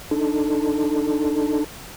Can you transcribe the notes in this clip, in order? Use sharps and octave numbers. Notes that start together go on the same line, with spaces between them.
D4 D#4 A4